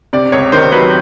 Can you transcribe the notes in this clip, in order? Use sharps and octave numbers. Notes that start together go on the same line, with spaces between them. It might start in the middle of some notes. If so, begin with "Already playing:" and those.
C3 D5
C#2 C#5
D#3 C5
F#3 B4